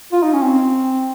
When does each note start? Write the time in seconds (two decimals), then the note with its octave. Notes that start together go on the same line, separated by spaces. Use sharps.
0.12 F4
0.23 D#4
0.33 C#4
0.42 C4